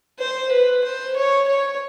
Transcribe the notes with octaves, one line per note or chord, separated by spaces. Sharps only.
C5
B4
C5
C#5
C#5